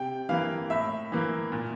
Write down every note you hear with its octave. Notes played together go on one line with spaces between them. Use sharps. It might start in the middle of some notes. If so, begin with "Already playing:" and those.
Already playing: C3 G5
E3 A#3 F5
A2 E5
E3 A#3
A#2